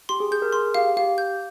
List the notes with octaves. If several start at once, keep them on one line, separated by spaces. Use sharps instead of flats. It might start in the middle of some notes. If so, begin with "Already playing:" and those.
G4 C6
G#4
G#4 G6
A#4
G#4 C6
G4 F5
G4 F5
G6